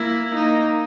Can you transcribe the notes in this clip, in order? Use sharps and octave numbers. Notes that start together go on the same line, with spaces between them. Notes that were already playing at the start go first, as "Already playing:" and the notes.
Already playing: A#3 E4
A#3 D#4